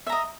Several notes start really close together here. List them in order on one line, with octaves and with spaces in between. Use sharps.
E5 A#5 D#5